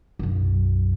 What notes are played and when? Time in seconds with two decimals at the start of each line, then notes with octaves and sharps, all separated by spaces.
0.19 B1 F#2